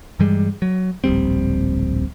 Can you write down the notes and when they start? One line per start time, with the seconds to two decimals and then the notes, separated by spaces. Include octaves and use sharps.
0.19 G2 E3 G3 G#3
0.62 F#3
1.04 D1 A#1 G3 C4